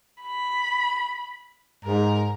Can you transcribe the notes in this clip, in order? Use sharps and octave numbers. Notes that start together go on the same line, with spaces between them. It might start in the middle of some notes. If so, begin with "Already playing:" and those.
B5
G#2 A#4